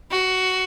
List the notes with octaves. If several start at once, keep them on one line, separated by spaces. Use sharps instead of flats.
F#4